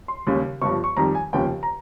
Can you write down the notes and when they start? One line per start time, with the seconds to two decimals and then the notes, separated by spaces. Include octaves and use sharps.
0.08 C6
0.27 D#2 C#3 G3
0.62 G1 G2 F3 C#6
0.84 C#6
0.97 F2 D#3 G3 A#5
1.15 G#5
1.33 F1 D#2 C#3 F3 G5
1.63 A#5